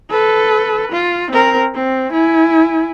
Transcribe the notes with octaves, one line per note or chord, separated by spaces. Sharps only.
A4 B4
F4
C4 A#4
C4
E4 G#5